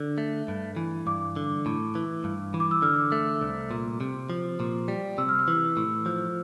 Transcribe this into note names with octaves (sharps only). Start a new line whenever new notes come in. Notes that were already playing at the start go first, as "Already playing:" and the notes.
Already playing: D3
A3
G2
E3
G2 D6
D3
A2
E3
G2
E3
D6
E6
D3 F6
A3
C2
A#2
C3
F3
A#2
G3
C3 E6
F6
E6
E3
A2
F3